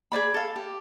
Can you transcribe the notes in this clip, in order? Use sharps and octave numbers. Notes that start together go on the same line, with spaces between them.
G#4 C5 D5 B5
A4 F5
G4